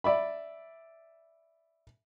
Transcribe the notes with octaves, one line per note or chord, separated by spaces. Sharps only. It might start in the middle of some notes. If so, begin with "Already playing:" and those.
D5 E5 B5